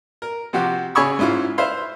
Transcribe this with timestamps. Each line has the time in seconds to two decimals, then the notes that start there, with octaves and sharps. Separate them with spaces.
0.22 A#4
0.53 C3 F3 F#4 G4
0.95 C#3 C#5 G#5 B5 C#6 E6
1.19 G#2 C#4 E4 F4
1.58 B4 C5 E5 F5 C6